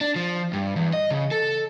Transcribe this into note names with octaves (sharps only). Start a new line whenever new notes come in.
D4
F3
G2
E2
D#5
C#3
A4